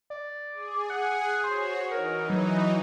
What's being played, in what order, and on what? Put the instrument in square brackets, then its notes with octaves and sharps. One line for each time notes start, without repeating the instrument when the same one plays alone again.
[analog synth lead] D5
[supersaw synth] G#4
[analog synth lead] F#5
[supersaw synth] F#4 C#5 [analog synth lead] C5
[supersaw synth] E3 D#4 [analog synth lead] A#4
[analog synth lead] F#3